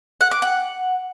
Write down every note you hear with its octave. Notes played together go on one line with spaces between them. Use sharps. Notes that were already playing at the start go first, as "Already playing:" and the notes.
F#5
D6
F#5